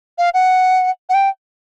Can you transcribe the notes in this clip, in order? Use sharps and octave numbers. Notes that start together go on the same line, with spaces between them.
F5
F#5
F#5
G5